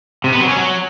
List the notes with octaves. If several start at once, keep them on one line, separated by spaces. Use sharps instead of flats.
C3
B3
F#3
C#4
F#3